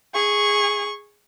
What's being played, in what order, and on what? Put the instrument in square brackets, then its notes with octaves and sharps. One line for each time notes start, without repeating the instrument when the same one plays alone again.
[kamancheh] G#4 C#6